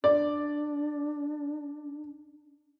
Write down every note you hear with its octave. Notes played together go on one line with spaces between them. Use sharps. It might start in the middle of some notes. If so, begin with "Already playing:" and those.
D4 D5